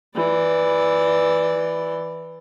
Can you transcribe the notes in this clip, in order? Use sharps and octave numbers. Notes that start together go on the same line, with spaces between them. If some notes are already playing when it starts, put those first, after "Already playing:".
E3 D5